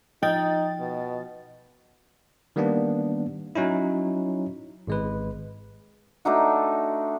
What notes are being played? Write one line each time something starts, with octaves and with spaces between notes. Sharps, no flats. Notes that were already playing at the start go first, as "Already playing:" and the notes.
F3 D#4 D#5 G5 A6
B2
D#3 G3 A#3 B3 D4
F#3 C#4 D#4 E4
G#1 G#3 B4
A3 D4 D#4 F#4